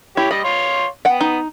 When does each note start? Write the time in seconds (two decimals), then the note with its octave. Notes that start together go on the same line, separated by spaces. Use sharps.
0.17 E4 G4 C#5
0.31 G3 D#5 B5
0.44 C#5 F5 C6
1.05 B3 F#5 G5
1.21 D#4